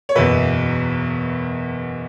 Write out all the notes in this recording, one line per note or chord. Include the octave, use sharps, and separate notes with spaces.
C#5
F#1 E2 B2 B4 E5